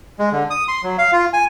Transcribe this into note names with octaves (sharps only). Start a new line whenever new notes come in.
G#3
D3
D#6
C6
F#3
F5
F4
G#5